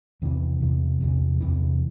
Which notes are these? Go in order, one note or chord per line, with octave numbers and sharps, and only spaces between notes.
E2 C3 E3
E2 C3 E3
E2 C3 E3
E2 C3 E3